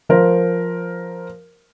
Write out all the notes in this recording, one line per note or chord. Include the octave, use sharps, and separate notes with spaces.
F3 A#4 C5